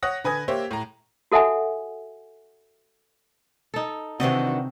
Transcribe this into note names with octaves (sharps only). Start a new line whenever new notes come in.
C#5 F#5 D#6 F#6 A#6
D3 B4 G#5 D#6 G#6
A#3 G4 C5 C#5 E5
A2 A#5
F#4 A4 E5 F#5 G#5
D#4 A4
C3 D#3 E3 C4 D4 F#4 D#5